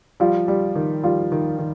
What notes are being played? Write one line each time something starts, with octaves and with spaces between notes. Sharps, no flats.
F3 G3 F4
G3
D#3
F3 G3 F4
D#3
D#3